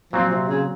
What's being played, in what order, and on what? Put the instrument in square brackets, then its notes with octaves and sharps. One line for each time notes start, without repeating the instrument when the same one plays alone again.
[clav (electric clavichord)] A#2 F#3 C4 [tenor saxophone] F3
[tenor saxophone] C3
C#3